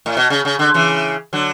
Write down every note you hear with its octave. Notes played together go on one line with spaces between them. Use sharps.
A2
B2
C#3
C#3
D3
C#3 E3
D3 F#3